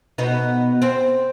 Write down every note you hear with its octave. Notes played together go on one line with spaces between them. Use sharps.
B2 B3 D#4
C4